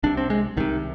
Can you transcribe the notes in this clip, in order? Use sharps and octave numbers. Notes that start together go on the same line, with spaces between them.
C2 C3 D4
C4
G#3
C2 C3 D#3